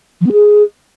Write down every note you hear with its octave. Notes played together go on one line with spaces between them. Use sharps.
F3
B3
G#4